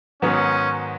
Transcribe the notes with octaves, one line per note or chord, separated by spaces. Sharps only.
G#2 D#3 F#3 B3 C#4 D#4